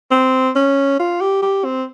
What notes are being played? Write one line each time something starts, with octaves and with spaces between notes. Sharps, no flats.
C4
C#4
F4
G4
G4
C4